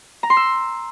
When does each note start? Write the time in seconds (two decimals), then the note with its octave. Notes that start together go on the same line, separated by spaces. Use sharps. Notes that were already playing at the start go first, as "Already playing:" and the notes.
0.23 A#5
0.30 C6
0.37 E6